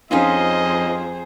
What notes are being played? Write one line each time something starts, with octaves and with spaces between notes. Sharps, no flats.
F2 C#4 D#4 F4 G#4 C5 D#5